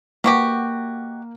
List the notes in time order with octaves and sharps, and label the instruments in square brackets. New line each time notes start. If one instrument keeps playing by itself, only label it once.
[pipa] B2 F#4 G4 [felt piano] A#3